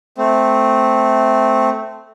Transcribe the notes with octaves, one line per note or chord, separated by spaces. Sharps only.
A3 C4